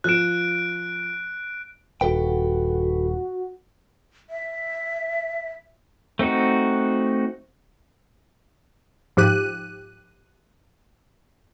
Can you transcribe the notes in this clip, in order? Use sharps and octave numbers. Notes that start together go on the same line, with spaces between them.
F3 F#6 D7 E7
D#1 F#4 A4 B4 G5
E5
A3 C4 D#4 F#4
G#2 F3 G4 F#6 D#7